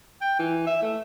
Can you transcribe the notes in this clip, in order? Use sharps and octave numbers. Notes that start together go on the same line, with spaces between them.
G5
E3
E5
A3